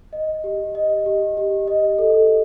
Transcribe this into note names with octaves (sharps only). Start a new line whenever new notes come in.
D#5
G4
D#5
G4
G4
D#5
A4